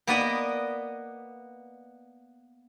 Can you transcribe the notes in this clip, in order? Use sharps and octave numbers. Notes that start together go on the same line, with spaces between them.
A#3 B3 B4 D5 D#5